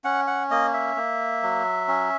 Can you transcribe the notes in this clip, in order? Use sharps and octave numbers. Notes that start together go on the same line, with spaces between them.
C#4 F#5
F#5
A#3 D#5
E5
A#3
F#3
C#4